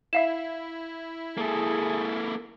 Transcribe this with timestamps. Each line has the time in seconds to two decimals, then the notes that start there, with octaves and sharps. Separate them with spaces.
0.13 E4 E5 F5 E7
1.38 A#3 G#4 A4